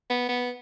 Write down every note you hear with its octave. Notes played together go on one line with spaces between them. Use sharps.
B3
B3